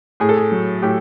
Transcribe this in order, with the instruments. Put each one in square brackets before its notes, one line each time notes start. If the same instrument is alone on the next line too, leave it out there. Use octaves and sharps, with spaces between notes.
[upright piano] A2 G#4
A4
G#4
F#3
A2 G4